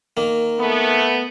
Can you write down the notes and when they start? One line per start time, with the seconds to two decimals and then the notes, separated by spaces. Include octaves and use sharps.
0.17 D#3 A#3
0.60 A3 B3